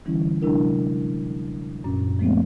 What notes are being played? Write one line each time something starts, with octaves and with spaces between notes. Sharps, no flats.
D3 E3 G3 C#4 E4
C3 F#3 G#3 D4 E4 A#4
F#2 A#2 C#4
F3 G#3 A3 B3 C4